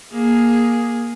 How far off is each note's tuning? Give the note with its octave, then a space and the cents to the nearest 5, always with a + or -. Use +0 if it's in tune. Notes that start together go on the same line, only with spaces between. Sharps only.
A#3 +10 G#4 +0